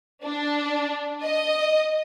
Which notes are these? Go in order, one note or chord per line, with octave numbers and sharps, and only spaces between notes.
D4
D#5